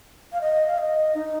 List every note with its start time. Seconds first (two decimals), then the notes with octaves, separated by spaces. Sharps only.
0.33 F5
0.41 D#5
0.67 F5
0.78 D#5
1.15 D#4